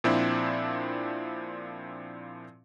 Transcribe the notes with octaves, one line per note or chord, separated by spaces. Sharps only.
A#2 F3 C4 D4 E4